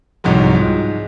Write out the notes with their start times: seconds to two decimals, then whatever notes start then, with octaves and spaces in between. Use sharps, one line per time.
0.24 C2 F2 G#2 F3 F#3
0.54 G#2